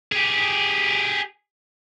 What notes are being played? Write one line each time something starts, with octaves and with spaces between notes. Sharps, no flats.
G4 G#4